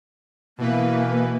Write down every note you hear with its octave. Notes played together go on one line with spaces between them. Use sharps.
B2 E3 A#3 B4